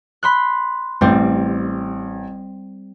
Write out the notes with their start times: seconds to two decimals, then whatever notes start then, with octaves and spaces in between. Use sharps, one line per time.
0.23 B5 C6 F#6
1.01 A1 G3 C4